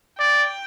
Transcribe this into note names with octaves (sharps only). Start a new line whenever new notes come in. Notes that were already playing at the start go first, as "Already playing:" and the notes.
D5 G5